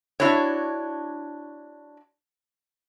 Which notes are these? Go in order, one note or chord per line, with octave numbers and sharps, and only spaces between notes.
D4 E4 F#4 C#5